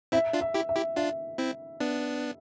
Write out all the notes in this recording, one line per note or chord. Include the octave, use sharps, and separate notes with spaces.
C4 E4 E5
D4 F4
E5
E4 G4
E5
E4 G4
D4 F4 E5
C4 E4
B3 D4